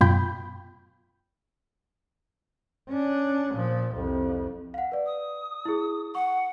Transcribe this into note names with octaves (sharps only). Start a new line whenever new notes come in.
F#2 B2 F4 G5 B5 G6
C#4 D4
A#2 F3
C2 F2
F5 F#5
B4 D5
D#6
E4 G#4
F#5 C#6